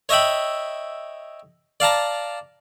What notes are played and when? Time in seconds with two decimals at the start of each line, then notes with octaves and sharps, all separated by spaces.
0.09 C#5 D#5 E5 G5 B5
1.80 D5 F5 A5 A#5